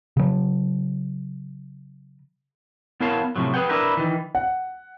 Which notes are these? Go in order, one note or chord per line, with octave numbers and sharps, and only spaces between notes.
C#3 F#3
B3 E4 A#4 C#5 F5 A5
A2 C3 F3 F#3
G#4 B4 C#5 F#5 G5
D4 E4 A#4 B4
D#3 E3
F#5